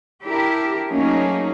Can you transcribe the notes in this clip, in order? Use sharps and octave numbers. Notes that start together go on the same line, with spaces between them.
D4 E4 G4 A#4
F#3 A3 A#3 C#4 D#4 G#4